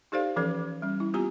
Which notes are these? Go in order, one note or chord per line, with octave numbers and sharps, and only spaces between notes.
D#4 G4 A4 C5 D5 F5
E3 F3 C#4 A4 B4
G3 C#4
E4
B3 C4 F4 G4 G#5 A#5